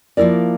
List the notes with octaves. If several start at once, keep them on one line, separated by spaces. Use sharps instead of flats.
F3 A#3 E4 A#4 D5